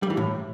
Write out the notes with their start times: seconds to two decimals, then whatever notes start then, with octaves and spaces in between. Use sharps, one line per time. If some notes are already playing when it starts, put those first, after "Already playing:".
0.03 G3
0.10 E3
0.17 A2